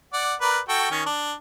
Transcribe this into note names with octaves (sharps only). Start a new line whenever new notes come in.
D5 F#5
A#4 B4 D5
F#4 A4 G5
D#3 C#4
D4